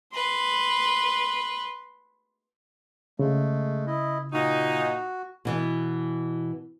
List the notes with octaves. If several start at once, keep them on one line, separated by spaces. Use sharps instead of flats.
B4 C6
C#3 G#3 A3
E4 D#5
A#2 D#4 F#4
B2 E3 B3